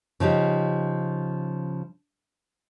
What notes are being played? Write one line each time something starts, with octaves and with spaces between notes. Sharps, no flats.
C#3 F3 D#4 G4